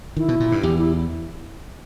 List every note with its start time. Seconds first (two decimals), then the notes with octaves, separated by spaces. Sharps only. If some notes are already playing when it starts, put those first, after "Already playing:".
0.17 D#3 E4
0.28 B2
0.40 A#2
0.52 G2
0.63 E2 G4
0.78 E4